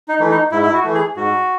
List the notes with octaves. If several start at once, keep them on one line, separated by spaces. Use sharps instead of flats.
D#4
E3 A3
D#4
G#2 E4
E4
F#4
E3 A3
G#4
G#2 F#4